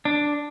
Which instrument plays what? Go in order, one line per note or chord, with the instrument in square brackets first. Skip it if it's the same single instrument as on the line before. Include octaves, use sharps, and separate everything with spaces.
[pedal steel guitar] D4